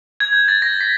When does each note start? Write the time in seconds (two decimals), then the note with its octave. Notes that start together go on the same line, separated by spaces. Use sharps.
0.20 G#6
0.33 G6
0.48 A6
0.62 A#6
0.81 B6